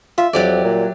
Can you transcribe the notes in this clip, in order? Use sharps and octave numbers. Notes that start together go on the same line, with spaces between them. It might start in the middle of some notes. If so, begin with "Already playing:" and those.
F4 E5
F2 F#3 G3 D5
A#2